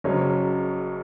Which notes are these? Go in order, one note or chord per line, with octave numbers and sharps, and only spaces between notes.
F#1 F#2 C#3 F#3 C#4